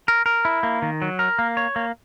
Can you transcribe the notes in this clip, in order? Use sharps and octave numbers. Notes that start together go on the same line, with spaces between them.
A#4
A#4
E4
A#3
D#3
F#3
A#4
A#3
C#5
A#3